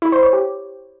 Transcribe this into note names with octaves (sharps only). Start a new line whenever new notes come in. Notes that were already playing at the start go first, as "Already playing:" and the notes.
E4
C5
C#5
G4